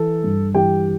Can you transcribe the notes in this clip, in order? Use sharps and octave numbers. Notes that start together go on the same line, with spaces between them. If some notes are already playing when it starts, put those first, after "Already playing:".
Already playing: E3 A4
G2
E3 G4 G5